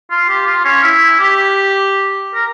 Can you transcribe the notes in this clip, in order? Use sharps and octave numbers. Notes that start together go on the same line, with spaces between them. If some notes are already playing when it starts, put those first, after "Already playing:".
F4
G4
F4
C#4
E4
G4
A#4